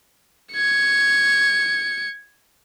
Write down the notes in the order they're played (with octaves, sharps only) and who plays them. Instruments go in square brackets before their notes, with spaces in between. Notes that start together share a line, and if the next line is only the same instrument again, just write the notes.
[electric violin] G#6 C#7